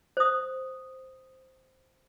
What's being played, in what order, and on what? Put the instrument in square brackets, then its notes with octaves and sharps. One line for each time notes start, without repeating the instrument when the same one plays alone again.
[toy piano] C5 D#6